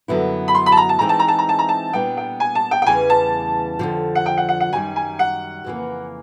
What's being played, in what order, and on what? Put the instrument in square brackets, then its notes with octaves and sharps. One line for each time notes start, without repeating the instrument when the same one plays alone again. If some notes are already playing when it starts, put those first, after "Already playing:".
[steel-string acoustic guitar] F#2 D3 F#3 B3 E4
[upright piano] B5
C6
B5
A5
A#5
A5
[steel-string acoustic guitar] E3 G#3 C4 D#4 [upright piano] A#5
[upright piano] A5
A#5
A5
A#5
A5
A#5
A5
[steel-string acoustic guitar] A#2 G3 B3 D4 [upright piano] G5
[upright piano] G5
G#5
A5
G5
G5
[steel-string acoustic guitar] E2 C#3 E3 G3 [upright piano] G#5
[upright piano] A5
[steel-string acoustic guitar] F2 D3 F3
[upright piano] F#5
G5
F#5
F#5
F#5
[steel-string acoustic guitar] F#2 D#3 G3 [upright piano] G#5
[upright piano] G#5
F#5
[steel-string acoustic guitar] F2 C#3 E3 G3 A#3